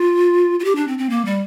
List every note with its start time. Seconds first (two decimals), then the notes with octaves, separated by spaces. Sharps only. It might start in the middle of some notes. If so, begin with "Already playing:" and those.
Already playing: F4
0.60 F4
0.64 G4
0.76 D4
0.87 C4
0.98 C4
1.10 A#3
1.25 G3